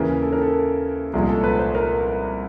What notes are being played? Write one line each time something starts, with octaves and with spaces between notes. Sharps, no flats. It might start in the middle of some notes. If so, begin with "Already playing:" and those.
Already playing: D#2 C#3 E3 A#4
A4
A#4
A4
C2 A#2 F3 G#3 G#4
A4
B4
C5
A#4